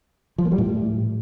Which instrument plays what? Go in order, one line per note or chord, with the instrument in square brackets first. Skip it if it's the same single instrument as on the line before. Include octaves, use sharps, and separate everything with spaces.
[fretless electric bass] F3
A#3
G3
A2